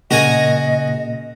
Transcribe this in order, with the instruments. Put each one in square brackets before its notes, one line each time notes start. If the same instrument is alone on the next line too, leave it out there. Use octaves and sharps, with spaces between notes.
[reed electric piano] A#2 A#3 [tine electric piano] C#3 [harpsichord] F#4 A#4 G#5 [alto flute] D#5